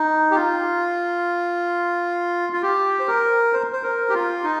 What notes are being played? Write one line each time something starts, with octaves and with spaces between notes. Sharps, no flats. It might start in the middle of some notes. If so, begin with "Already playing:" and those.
Already playing: D#4
G4
F4
F4
G4
C5
A#4
C5
C5
A#4
G4
F4
D#4